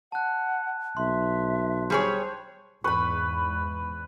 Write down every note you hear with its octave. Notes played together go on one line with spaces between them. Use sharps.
F#5 A5 F#6
B1 E5 C6
G3 G#4 C5 C#5
E2 G#2 B4 B5 C#6